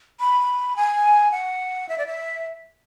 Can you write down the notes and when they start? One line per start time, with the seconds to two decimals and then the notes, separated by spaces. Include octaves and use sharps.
0.20 B5
0.76 G#5
1.31 F#5
1.89 E5
1.98 D5
2.06 E5